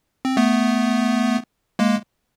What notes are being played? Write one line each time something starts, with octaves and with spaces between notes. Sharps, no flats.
C4
A3 B3
G#3 A#3